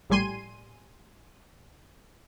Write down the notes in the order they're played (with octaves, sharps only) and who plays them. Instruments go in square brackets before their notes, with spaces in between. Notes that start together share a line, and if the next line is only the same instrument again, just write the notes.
[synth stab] A#1 A2 G3 G#5 C6 D#7